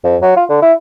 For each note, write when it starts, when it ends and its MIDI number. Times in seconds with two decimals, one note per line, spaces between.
0.04 0.17 41
0.22 0.34 54
0.37 0.45 65
0.49 0.61 50
0.62 0.72 64